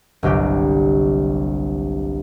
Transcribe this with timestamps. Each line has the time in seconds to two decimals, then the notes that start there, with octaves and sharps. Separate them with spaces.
0.23 G1 C2 F#3 G4